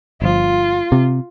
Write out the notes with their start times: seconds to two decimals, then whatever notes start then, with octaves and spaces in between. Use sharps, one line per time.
0.22 G1 F3 F4
0.92 C3